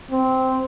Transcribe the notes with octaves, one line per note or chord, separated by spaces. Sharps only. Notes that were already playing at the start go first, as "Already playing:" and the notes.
C4